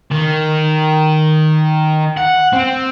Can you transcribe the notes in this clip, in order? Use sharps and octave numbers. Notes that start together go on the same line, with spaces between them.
D#3
F#5
C4